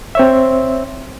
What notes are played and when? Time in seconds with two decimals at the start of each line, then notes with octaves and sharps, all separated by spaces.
0.15 C4 C#5 E5